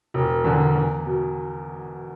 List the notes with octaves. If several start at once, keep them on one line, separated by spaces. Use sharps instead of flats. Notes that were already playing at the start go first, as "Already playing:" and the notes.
E1
E2 D3
E2
B2